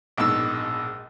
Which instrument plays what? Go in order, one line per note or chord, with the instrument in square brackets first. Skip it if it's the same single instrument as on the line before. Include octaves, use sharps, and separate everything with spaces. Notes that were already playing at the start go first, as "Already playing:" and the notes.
[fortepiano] A#1 G#2 B2 E6